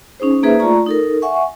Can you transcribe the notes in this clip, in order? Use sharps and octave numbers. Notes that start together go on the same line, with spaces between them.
C#4 D#4 G#4 C5
A#3 D#4 G#4 B4 C5 E5
A3 F4 D5 A#5 C#6
D#4 A4 A#4
E5 F#5 G#5 C#6